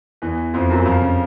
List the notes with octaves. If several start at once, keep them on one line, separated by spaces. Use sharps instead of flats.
E2 E3
F2 F3
F#2 F#3
F2 F3
C#3